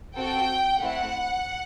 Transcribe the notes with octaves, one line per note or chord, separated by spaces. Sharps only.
C4 F#4 A4 G5
A3 C4 E4 F#5